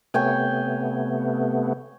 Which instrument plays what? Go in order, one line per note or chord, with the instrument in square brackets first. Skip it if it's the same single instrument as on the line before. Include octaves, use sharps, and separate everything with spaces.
[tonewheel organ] C3 A3 B3 [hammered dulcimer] C#5 G5 G#5